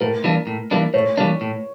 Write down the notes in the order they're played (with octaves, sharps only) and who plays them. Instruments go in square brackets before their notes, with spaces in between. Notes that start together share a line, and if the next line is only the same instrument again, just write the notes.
[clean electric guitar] A2 [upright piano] A#4
[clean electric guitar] E3 G3 A#3 D4
A2
E3 G3 A#3 D4
[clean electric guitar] A2 [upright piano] C#5
[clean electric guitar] E3 G3 A#3 D4
A2